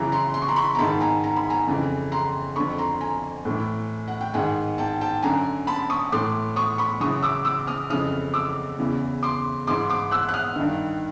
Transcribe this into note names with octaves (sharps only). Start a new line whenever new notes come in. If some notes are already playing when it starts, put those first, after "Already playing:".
Already playing: F#2 C#3 E3 G#5 A#5
A#5 C6
C6
C#6
A#5 C6
B5 C#6
A#5
G#2 D#3 A5 B5
G#5 A#5
A#5
B5
G#5 A#5
F2 C#3 E3
A#5 C6
F2 D3 B5 C#6
A#5 C6
G#5 A#5
A2
E3
F#5
G5
G#2 D#3 F#5 G#5
G5 A5
G5 A5
F#2 D3 G#5 A#5
A5 B5
C#6 D#6
A2 E3 C6 D6
C#6 D#6
B5 C#6
F#2 C#3 E3 C#6 D#6
D6 E6
D6 E6
D#6 F6
F2 C#3 E3 D#6 F6
D6 E6
E2 C#3 E3
C6 D6
G#2 E3 C6 D6
C6 D6
E6 F#6
F#6
D#6 F6
G2 D#3